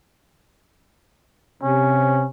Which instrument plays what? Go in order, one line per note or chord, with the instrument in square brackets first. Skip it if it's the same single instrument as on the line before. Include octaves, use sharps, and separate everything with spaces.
[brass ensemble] C3 [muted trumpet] C#4